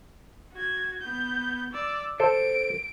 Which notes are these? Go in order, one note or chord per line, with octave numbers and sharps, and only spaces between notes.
F#4 G#6
B3 G6
D5 E6
A4 C5 D7